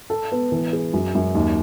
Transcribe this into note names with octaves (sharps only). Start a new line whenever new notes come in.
A4
B3
E3
G#4
F#2
F#2
D#2